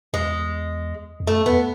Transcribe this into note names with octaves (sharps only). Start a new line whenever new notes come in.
E2 G#3
E2
F#2 A3
E2 B3